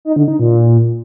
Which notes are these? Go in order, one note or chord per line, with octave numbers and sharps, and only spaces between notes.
D#4
D3
D#4
A#2